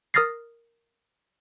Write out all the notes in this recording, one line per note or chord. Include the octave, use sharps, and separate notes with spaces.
A#4 D#6 F6 A6 A#6 C7